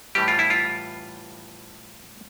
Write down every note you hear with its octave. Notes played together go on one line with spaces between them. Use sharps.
A2 E3 G3 G4
F4
E4
F4